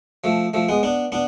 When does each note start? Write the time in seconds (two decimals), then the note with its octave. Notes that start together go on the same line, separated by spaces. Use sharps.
0.24 F3 A3
0.54 F3 A3
0.69 G#3 B3
0.83 B3 D4
1.12 B3 D4